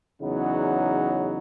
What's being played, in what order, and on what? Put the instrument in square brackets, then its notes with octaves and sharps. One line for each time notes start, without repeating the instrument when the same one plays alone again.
[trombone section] E2 C#3 F#3 B3 D#4